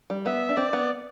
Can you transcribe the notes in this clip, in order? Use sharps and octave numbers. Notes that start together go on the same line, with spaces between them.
G3
B3 E5
D4
C4 D5
B3